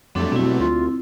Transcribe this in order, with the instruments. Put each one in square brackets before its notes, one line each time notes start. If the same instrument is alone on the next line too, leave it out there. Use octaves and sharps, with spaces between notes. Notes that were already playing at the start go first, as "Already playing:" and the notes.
[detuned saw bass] F2 [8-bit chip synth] F#3 G3 A3 [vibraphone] C4 D4 A4
[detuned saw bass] B2 [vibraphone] C4 E4
[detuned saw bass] D2 [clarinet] F4